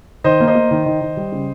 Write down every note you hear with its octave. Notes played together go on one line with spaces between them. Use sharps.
D#3 C5 D#5
A#3
C5 D#5
A#3
D#3
D#3
D#3
G3
C#3